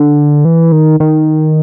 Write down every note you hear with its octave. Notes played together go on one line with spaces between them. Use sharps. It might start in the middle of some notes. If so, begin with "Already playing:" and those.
Already playing: D3
E3
D#3
D#3